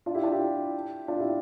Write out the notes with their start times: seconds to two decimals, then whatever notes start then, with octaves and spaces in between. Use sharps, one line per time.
0.06 D4 F4
0.15 E4 G4
0.23 D4 F4
0.32 E4 G4
1.08 D4 F4
1.20 E4 G4